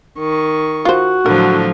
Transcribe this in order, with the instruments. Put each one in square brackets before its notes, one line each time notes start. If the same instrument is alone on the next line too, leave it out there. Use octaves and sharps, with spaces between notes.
[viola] D#3 C#6
[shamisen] F4 C5 [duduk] F#4
[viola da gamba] A2 F3 F#3 [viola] D3 [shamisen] A#4